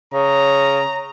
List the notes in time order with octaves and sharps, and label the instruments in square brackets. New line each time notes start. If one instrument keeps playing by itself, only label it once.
[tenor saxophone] C#3 [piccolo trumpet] A#5